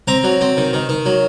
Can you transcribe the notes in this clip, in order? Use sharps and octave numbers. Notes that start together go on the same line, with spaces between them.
C4 A#5
F#3
C4
D#3
D#3
D#3
F#3